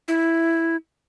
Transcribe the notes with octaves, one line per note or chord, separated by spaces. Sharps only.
E4